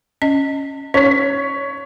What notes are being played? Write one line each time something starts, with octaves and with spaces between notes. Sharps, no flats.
C#4 D#5
C#4 C#5 B6